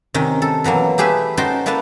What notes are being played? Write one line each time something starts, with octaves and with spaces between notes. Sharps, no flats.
C3 D#3 C#4
A4
B2 E3 F#3 A#3
A3 G4 G#4 B4 E5
C#4 D#4 F#4 C5 G5 A5
A#3 E4 A4 B4 A5